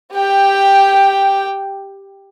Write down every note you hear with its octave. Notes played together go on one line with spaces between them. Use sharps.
G4 G5